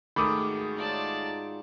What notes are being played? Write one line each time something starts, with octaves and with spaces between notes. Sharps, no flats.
G#2 D#3 A3 F#4 G#4 B5 D6 D#6
D#4 F4 D5 F#5 A5